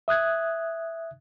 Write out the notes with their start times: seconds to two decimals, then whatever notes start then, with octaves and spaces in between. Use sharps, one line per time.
0.08 E5 D#6 F#6 G#6